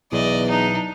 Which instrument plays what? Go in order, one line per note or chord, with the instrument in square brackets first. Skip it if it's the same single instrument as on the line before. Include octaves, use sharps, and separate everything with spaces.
[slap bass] B1 F#3 [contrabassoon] E2 [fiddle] D5 D#5
[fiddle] D4 D#4